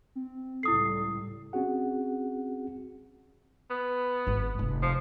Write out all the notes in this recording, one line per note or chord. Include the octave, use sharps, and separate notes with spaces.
C4
C#2 A2 G3 E4 A4 D#6 C7
C4 C#4 F#4 G#4 F#5
B3
G#1 F4
F1
F3